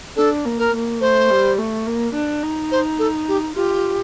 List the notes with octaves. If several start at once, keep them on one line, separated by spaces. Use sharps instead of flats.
D4 A4
A#3
A#4
A#3
A3 C5
G3
A3
A#3
D4
D#4
C5
A4
G4
F4 G4